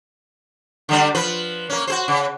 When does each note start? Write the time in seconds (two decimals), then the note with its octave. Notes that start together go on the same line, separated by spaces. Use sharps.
0.89 D3 G3 D4
1.15 F3 B4
1.69 A#3 C#4
1.87 F#4 G#4 C5
2.08 C#3